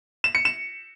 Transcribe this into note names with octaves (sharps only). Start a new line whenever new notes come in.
E7
C#7
E7